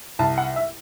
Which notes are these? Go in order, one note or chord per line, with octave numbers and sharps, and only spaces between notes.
C2 A5
F#5
E5